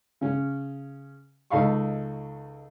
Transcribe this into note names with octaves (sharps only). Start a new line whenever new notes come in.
C#3 C#4
C#2 D#4 A4 F5 B5 C#6